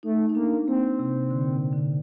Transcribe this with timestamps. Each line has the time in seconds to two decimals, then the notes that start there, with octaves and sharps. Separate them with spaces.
0.03 A3 D#4
0.29 D#4
0.35 A#3 D4
0.67 A#3 C4
0.99 C3
1.31 D3
1.41 A#2
1.53 C3
1.73 D3